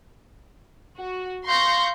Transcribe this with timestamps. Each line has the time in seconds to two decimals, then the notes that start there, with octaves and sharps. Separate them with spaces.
0.97 F#4
1.47 F5 C6 C#6 G6 A#6